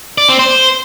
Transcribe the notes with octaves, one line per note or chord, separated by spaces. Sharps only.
D5
C4
C5